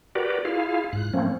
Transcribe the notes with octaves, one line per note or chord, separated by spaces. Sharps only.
F#4 G4 A#4 B4 D5
E4 F4 G#4 F5
G#2 F#6
F3 A3 A#3 C4 C#4